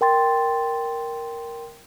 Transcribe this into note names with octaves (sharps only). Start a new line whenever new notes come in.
A#4 G5 C6 A6